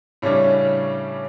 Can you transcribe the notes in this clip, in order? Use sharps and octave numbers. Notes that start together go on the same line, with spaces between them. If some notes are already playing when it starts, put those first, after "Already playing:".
A2 C#3 G3 C#4 D4